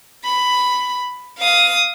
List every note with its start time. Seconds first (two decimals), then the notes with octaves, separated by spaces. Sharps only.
0.24 B5
1.39 F5 D#6